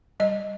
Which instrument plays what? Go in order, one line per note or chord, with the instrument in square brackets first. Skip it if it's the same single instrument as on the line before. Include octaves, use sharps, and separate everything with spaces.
[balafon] G3 D#5